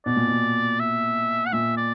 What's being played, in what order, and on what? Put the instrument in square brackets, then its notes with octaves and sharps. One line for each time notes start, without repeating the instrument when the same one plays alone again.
[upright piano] B2 [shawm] D5
[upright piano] A#2
B2
[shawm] E5
F#5
[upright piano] A#2 [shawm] E5
[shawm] D5